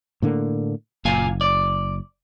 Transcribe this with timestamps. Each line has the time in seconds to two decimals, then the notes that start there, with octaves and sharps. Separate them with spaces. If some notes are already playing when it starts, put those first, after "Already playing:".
0.22 A2 D3 A#3
1.05 F#1 A#2 F5 G#5
1.41 D5